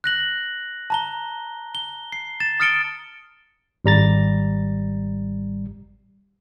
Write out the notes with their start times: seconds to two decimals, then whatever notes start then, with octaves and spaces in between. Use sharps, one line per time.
0.04 F#6 A#6 F#7
0.90 A5 A#5 G7
1.75 G7
2.12 C7
2.40 A6 E7
2.60 D#6 F6 A6 C#7 D7 G7
3.85 G#1 G3 A#5 A6